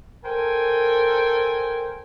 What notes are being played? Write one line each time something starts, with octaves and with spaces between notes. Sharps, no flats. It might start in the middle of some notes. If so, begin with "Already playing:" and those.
A4 A#4 C5 G5 G#5